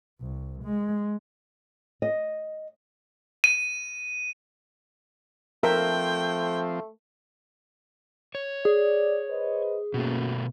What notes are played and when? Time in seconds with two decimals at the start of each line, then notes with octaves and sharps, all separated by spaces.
0.21 C2
0.63 G#3
2.02 D#5
3.44 D#7
5.63 F3 A3 C4 A4 A#4 E5 G5
8.35 C#5
8.65 G#4 D5
9.29 B4 C5 D#5
9.94 B2 A3 A#3 C#4 F#4